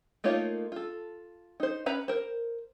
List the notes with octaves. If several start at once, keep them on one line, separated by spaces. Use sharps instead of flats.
A3 A#3 D#4 F4 C#5
F4 A4
D#4 C5
C#4 B4 A#5 B5
A#4 C5